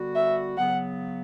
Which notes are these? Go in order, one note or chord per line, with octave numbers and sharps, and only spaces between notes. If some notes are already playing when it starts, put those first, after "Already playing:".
Already playing: D3 G3 B3 F#4
E5
C#3 F#3 B3 F#5